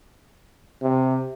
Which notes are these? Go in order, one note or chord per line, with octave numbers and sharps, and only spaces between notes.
C3